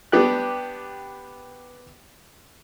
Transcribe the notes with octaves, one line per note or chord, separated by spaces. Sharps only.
B3 D4 G4 G5 F#6